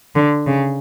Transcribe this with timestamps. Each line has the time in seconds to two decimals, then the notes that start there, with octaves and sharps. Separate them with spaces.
0.15 D3
0.47 C#3